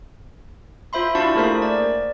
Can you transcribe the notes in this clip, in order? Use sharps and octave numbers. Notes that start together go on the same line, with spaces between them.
F4 C5 E5 B5 C6
D4 E4 F#4 F5 A5 C#6
A3 A#3 G#4 A#4 C5 B6
D5